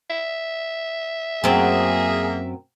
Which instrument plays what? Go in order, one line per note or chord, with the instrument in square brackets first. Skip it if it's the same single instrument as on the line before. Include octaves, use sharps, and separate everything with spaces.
[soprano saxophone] E5
[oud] F#2 C4 [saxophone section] A#3 G#4